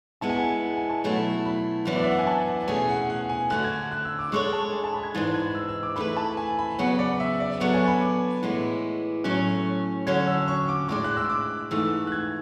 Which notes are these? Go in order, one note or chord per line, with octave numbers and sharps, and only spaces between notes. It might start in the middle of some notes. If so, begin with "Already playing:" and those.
G#3 B3 E4 A5
G#5
A5
F#5
G#5
A5
B2 F#3 A3 E4
B5
F#2 E3 B3 D4
D5
E5
F#5
G#5
A5
F#5
E2 B2 A3 C#4 G#4 G#5
F#5
F#5
G#5
D3 A3 D4 F#4 F#6
G#6
F#6
E6
D6
G#3 D4 A4 C#5 C#6
A5
G#5
A5
B5
G#6
G#2 E3 G#3 D4 A6
G#6
E6
E6
D6
E3 A3 E4 B4 B5
A5
G#5
B5
C#3 F#3 B3 F#5
D5
E5
D5
F#3 B3 D4 A4 C#5 F#5
G#5
B5
D6
A2 E3 G#3 B3 E4
A2 F#3 A3 C#4 F#6
D3 F#3 C#4 F#4 A4 G#6
E6
C#6
D6
A2 G#3 D4 D6
F#6
E6
D6
G#2 E3 A3 E6
F#6
G#6